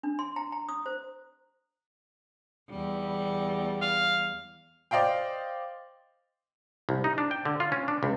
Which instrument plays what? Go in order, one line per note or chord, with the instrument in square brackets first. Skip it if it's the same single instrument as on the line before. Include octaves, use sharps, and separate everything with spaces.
[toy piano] D4
C6
A#5
A#5
D#6
C5
[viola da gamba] E2 G3
[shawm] F5
[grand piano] C5 D5 D#5 F5 G5
[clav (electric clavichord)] C2
D#4
D4
G5
D3
F4
C#4
D4
C#2